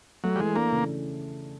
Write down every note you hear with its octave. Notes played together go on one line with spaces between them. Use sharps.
F#3 A3
G3
E3 G#3
A#3 D4
C#3